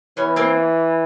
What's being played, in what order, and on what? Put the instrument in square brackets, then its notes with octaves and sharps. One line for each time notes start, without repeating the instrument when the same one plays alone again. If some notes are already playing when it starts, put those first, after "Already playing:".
[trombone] E3 [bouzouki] B3 C#4
[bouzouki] A#3 C4